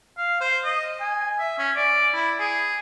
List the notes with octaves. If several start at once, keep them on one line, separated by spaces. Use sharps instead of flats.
F5
C5
D#5
G#5
E5
C#4
D5
E4
G#4